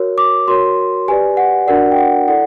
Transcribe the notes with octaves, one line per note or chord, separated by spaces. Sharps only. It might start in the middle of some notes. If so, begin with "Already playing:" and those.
Already playing: F#4 A#4 C#5
D6
F#4 A#4 C#5 C6
G4 B4 D5 G#5
F#5
D4 F#4 A#4 D5 F#5
G5
F#5
E4 A4 D5 F#5